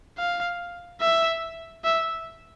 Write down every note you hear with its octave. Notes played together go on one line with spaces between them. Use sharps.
F5
E5
E5